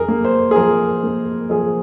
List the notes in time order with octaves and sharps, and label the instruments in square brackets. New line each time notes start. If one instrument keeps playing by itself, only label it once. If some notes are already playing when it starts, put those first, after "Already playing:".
Already playing: [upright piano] F2 G#4 A#4
A#3
C5
G#4
F3 A#4
A#3
F3 G#4